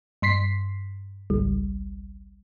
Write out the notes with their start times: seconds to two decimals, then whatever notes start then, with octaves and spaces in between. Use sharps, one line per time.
0.22 G2 C6 B6 C7
1.30 G#1 C#2 G3